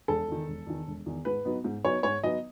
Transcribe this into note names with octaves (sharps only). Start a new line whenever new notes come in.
E1 A4
E2 D#3
E1
E2 D#3
E1
E2 D#3
G#2 B4
F#3 B3 D#4
G#2
F#3 B3 D#4 C#5
G#2 C#5
F#3 B3 D#4 D#5